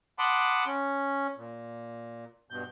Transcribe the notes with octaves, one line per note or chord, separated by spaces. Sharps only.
F#5 A5 B5 C6 D6 D#6
C#4
A#2
G2 B2 G6